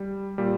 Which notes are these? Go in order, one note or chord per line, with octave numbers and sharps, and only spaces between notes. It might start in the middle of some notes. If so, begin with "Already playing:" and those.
Already playing: G3
A#2 G3